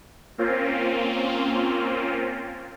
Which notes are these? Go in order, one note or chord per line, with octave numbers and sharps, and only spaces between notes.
A#3 C4 C#4 F4